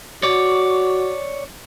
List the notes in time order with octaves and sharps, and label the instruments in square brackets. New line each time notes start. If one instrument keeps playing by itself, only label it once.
[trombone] F#4 [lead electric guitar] C#5 D5